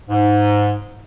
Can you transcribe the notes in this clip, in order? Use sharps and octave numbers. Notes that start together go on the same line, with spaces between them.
G#2